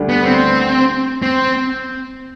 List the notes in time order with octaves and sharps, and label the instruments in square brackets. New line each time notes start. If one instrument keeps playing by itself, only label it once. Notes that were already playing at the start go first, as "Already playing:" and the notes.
Already playing: [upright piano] D2 D3 G3
[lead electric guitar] B3
C4
C4